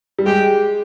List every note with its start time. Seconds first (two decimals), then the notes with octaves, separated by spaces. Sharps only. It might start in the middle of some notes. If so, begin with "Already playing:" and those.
0.18 G3
0.26 G#3 G4